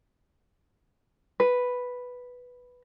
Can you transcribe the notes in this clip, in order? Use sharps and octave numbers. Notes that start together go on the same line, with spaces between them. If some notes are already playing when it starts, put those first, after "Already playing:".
B4